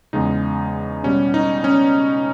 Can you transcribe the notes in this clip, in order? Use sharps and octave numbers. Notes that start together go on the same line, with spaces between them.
E2 C#3 G#3 D#4
B2 G3 C#4
D#4
C#4